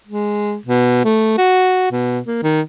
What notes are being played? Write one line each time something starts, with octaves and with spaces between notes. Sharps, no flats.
G#3
B2
A3
F#4
B2
A#3
D#3